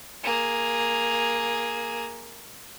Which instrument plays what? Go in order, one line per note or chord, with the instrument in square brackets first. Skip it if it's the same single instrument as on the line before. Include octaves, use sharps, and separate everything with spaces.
[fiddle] A#3 G#4